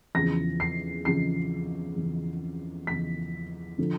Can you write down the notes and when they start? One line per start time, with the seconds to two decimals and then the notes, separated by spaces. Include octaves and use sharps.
0.15 E2 C#3 F3 A#6
0.60 C7
1.05 E2 C#3 F3 C7
1.96 E2 C#3 F3
2.87 E2 C#3 F3 B6
3.78 D3 F3